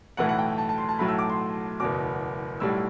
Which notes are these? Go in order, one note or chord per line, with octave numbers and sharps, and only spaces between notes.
B1 A2 E3 A3 F#5
F#5
G5
A5
A5
C6
A5
B1 A2 F#3 A3 B5
E6
D6
C6
F#1 E2 B2 D6
B1 A2 G3 E6